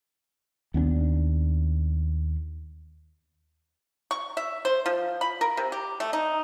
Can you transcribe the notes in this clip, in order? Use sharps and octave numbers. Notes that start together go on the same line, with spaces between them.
D#2 B3 C#4 D4
C#6
E5
C5
F3
B5
A#4
C3
G4
A3
D#4